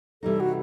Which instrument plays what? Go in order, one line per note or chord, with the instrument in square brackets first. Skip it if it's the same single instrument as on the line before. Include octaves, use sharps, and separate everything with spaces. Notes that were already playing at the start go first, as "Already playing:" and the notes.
[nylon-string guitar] C3 E3 G3 D#4 [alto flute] A4
[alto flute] F#4